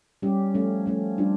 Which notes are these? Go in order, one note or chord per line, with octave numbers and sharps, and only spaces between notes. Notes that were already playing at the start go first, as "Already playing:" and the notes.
G3 C#4 G4
F3 A3 C#4
F3 A3 C#4
G3 D4 F4